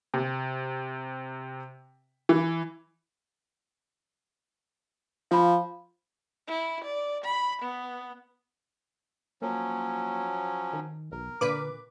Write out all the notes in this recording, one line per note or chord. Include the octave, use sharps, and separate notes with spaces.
C3
E3
F3 F5 B5
E4
D5
B5
B3
F3 F#3 A#3 C#4
D#3
B1 A#4
A#2 D3 B4 D6